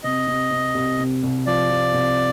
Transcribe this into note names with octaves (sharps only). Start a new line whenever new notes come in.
C3 D#5
C3
C3
C2
C3
C2
F3 D5
F3
C2